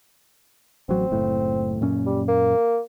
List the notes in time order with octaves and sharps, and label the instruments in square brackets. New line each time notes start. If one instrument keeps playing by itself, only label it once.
[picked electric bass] A1 F#3 [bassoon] C4
[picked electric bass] F#1 A2
F#2 A#2 C#4
[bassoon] G3
A#3